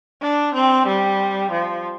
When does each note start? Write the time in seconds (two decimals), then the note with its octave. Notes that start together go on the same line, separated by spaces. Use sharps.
0.22 D4
0.55 C4
0.87 G3
1.51 F3